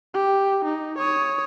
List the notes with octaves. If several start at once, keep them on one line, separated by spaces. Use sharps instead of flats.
G4
D#4
C#5 D#6